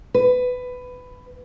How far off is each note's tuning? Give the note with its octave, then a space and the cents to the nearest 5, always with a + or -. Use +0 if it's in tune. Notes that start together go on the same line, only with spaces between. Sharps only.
B4 +15